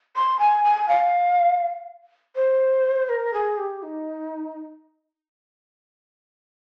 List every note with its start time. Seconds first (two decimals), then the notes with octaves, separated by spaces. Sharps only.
0.16 C6
0.39 G#5
0.64 G#5
0.88 F5
2.36 C5
3.09 A#4
3.33 G#4
3.58 G4
3.83 D#4